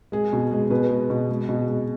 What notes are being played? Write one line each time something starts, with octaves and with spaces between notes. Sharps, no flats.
G#3 G#4
B2
G#3
B2 B4
G#3
B2
G#3
B2
G#3